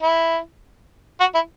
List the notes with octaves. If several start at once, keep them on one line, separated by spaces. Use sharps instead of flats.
E4
F#4
E4